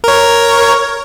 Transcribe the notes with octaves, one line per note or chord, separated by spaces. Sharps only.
A#4 C#5